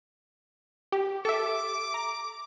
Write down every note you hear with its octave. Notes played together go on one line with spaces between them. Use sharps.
G4
A4 E5 D6
A#5